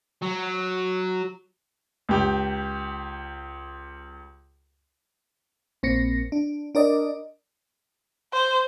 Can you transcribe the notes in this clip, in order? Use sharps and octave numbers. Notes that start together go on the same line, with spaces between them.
F#3
C#2 G4
A#1 A#3 C4 A#6 C#7
D4
D4 A#4 D5 D#5
C5